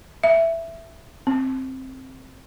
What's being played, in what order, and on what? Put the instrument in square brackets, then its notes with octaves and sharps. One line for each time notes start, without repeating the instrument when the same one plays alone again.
[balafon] E5
C4